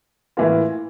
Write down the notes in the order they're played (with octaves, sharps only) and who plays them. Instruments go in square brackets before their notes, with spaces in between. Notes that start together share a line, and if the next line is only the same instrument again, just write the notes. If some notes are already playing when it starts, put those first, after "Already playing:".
[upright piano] A2 E3 A#3 F4